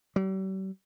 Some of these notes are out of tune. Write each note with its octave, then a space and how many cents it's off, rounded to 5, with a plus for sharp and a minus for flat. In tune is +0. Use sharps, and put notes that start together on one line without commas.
G3 -45